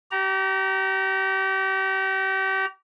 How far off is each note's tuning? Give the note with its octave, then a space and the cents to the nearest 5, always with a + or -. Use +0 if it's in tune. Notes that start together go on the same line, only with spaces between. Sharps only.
G4 -35 A#5 +0